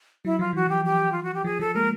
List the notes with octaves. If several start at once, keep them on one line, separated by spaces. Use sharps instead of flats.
F#3 E4
F3 F4
E3 F#4
F3 G4
G4
F4
F#4
G4
F3 G#4
F3 A4
G#3 A#3 A#4